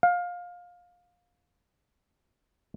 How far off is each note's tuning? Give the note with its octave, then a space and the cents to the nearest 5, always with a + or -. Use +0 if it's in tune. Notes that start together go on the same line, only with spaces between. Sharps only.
F5 +20